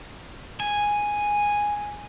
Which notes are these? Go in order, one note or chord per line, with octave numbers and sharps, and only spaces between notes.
G#5